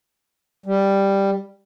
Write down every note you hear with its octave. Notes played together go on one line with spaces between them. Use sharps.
G3